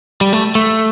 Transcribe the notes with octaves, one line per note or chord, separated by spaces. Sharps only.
G3
A3
A3